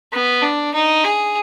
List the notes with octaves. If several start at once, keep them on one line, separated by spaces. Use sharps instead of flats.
B3
D4
D#4
G#4